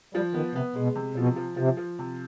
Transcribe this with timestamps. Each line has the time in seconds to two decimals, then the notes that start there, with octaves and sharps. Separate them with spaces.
0.15 F3 G3
0.34 D#3 B3
0.55 C3 B3
0.75 B2 G#3
0.95 C3
1.16 B2 F3
1.36 F3
1.57 C3 F3
1.77 F3
1.99 C3